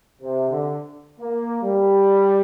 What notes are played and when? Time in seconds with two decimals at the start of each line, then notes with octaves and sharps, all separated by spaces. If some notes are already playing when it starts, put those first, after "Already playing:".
0.22 C3
0.50 D3
1.20 A#3
1.62 G3